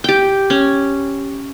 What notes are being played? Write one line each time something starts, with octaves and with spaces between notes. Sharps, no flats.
G4 G5
C#4